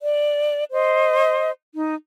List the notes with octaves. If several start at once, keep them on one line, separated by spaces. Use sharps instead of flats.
D5
C5 D#5
D#4